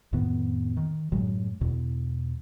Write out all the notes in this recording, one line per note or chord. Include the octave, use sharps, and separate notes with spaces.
F2 A2 D#3 B3
D#3
F#2 A2 F#3 G#3
E2 B2